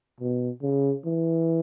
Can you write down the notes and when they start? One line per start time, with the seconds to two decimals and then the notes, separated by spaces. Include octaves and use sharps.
0.20 B2
0.63 C#3
1.05 E3